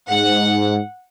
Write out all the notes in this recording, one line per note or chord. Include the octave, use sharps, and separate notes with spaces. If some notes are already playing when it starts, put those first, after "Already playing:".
G#2 F#5